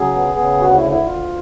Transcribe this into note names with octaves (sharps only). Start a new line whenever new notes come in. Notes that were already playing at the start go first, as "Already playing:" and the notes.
Already playing: C#3 F#3 G#4
B3
C#3
D2 F#4
E4
D3
E4
D2 F4